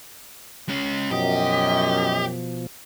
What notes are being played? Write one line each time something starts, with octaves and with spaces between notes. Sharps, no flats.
G#3 C#4
F#2 B2 F3 G4 D#5